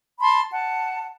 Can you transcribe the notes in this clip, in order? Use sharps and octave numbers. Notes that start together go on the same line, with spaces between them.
A5 B5 C6
F#5 A5